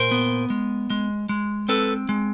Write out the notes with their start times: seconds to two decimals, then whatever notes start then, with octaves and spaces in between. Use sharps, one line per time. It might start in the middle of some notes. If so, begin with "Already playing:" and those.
Already playing: A#2 A#4 C5
0.11 B3
0.50 G#3
0.90 G#3
1.29 G#3
1.69 C4 A4 B4
2.09 G#3